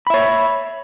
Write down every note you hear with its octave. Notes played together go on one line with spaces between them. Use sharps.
C#5 E5 B5